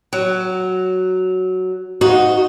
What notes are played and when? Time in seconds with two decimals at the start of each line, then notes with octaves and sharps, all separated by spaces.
0.13 F#3
2.01 D#4 F#4